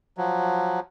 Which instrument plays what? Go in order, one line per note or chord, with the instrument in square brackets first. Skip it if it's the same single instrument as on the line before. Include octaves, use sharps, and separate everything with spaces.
[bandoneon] F3 F#3